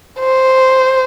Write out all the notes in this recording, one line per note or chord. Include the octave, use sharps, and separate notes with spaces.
C5